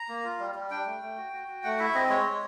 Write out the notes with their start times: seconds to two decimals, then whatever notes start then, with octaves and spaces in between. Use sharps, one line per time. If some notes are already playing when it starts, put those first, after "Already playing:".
Already playing: A#5
0.09 A#3
0.24 F4
0.40 G3
0.55 G3
0.71 D4 G5
0.86 A3
1.02 A3
1.17 F#4
1.33 F#4
1.48 F#4
1.64 A3 F#5
1.79 E4 E5
1.95 C4 D#5
2.09 G#3 C#5
2.26 G#3